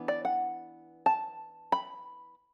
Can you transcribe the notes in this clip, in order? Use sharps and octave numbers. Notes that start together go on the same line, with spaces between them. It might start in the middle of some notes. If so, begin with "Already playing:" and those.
Already playing: E3 B3 D4
D5
F#5
A5
B5